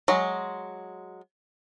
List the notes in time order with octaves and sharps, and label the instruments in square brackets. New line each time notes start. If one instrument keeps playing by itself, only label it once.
[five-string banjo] F#3 G#3